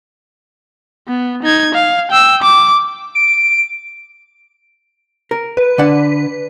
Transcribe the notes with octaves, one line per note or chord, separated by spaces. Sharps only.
B3
D#4 G#6
F5
G5 E6
D6
D7
A#4
B4
D3 D4 F#5